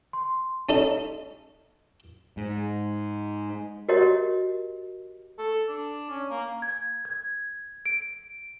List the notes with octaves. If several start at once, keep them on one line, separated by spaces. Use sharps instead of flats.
C6
C#4 D#4 A4
G#2
F#4 G4 A#4 C#5 D#5
A4
D4
C#4
A#3
G#6
G#6
D7